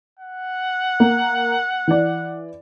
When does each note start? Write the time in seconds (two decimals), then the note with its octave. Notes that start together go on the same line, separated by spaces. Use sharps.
0.19 F#5
1.00 A#3
1.88 E3 D5